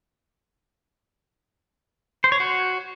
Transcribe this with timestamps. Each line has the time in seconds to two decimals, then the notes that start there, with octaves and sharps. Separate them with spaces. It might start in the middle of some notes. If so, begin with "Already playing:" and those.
2.24 C5
2.32 C#5
2.40 F#4